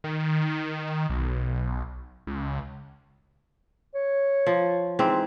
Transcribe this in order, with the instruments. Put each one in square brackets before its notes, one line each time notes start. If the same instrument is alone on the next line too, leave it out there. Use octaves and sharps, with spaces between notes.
[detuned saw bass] D#3
B1
C#2
[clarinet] C#5
[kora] F3
G#2 E3 C4